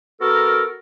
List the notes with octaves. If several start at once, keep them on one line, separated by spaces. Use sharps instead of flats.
B3 F#4 A4 A#4